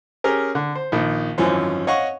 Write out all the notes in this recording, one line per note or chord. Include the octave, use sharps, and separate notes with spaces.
C#4 G4 G#4 A#4
D3
C5
A#1 D#3
G#1 F#2 E3 F3 C#4 C5
C#5 D#5 F5 F#5 C#6